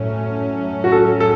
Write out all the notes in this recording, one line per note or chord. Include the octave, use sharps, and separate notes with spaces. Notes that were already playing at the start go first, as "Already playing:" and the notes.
Already playing: A2 F#3 A3 C#4
F#4
A4
A4